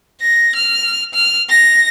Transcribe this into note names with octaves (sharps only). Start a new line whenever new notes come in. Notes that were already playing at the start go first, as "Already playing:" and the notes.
A#6
F6
F6
A#6